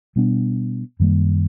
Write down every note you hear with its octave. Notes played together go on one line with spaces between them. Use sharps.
B2 G3 B3 D4
F#2 D#3 G3 A#3